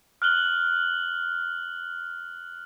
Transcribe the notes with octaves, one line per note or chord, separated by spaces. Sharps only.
F6 F#6 F#7 G7